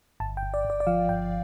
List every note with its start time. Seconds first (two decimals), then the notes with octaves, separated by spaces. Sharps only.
0.20 G1 A5
0.37 G5
0.43 G1
0.54 D5
0.65 G1
0.70 D5
0.80 D5
0.87 F3 F5
1.09 G1 G5